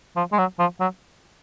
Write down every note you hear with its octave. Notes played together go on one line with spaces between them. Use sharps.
F3
G#3
F#3
F3
F#3